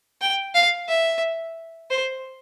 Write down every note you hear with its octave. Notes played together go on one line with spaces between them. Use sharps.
G5
F5
E5
C5